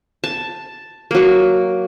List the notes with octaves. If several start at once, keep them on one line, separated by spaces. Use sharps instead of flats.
A5
F#3 A#3